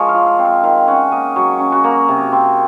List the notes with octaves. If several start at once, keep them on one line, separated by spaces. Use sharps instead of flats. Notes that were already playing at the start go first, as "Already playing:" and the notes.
Already playing: F3 G#3 G#4 A#4 C#5
F5
F4
F5
C4
F5
D#3 F5
C#4 F#5
A#3 D#5
F#3 F#4
C#4
F#4
A#3
C3
C4